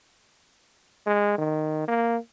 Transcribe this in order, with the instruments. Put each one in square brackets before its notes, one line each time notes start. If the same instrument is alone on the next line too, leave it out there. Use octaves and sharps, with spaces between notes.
[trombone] G#3
D#3
A#3